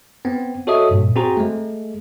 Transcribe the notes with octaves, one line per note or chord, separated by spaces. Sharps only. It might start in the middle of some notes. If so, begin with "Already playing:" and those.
B3 C4
F#4 A4 C#5 D#5 E5 D#6
G2 A#2
C4 F#4 G#4 C5 A#5
G#3 A3